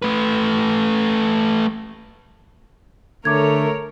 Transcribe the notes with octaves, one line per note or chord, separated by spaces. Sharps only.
A3 B4
D3 A3 A#4 C#5 D6 G#6